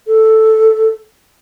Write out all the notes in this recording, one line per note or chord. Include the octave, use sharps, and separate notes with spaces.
A4